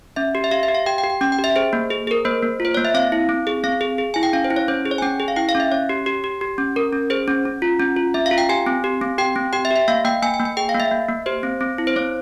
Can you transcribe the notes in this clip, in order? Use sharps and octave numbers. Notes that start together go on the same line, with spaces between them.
C#4 E5
G4
E5
G4 F5
E5
G4
F5
G4 G5
G5
G4
G5
C#4 G5
G5
G4
E5
G#4 C5
A#3
G#4
G#4 A#4
A#3 C5
A#3
F4 C5
A#3 C#5
E5
C4 F5
E4
C4
G#4
C4 F5
G#4
G#4
E4 G#5
G5
C#4 F5
C5
E4
C#5
C#4 C5
G#4
C#5
G#5
C#4 G5
G#4
F5
E4 G5
F5
C#4 E5
C#4 C#5
G4
G4
G4
G4
C#4
C#4 A#4
C#4
G#4 C5
C#4
C#4
F4
C#4
F4
C#4 E5
F5
F4
G5
G4 G#5
C4
G4
C4
G4 G5
C4
G4 G5
E5
G4
E5
A#3 F5
A#3 G5
A#3 G#5
G#5
A#3
G#5
G#4 G5
F5
A#3
E5
A#3
A#3
G4 C5
C4
C4
E4
C5
C4 C#5